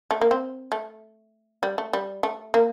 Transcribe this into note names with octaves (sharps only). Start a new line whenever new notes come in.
A3
A#3
C4
A3
G3
A3
G3
A3
A#3